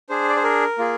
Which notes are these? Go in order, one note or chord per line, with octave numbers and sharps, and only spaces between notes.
D4 G#4 C5
D5
C5
A#4
A#3 F4 G#4